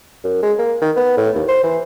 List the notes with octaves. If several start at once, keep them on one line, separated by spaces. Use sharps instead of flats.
F#2
G#3
A#3
D#3
B3
A2
D#2
C5
E3